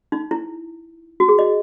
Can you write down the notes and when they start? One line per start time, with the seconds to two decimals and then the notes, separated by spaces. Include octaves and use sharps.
0.12 D#4
0.31 E4
1.20 F#4
1.29 G#4
1.39 D#5